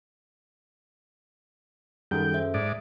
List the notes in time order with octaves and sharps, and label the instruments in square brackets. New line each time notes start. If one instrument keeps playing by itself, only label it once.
[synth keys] F#2 [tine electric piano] D#3 G3 [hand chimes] G#4 A4 [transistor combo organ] G5
[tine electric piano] C5 [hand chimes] E5
[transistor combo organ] G#2 D5 [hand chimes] D#6